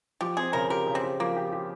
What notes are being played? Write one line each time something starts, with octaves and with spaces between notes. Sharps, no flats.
F3 G4
C4 G#4
C#3 A#4
G4 A#4
C#3
C4
G4
F3 A#3
G4
G4